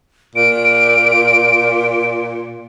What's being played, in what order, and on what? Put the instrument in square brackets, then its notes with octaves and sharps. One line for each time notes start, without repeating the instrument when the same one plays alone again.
[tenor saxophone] A#2 [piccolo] D7